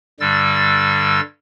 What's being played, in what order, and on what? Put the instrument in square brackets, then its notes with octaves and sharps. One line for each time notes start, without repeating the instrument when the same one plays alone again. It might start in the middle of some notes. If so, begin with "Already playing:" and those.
[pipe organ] G2 D3 G3 E6 A6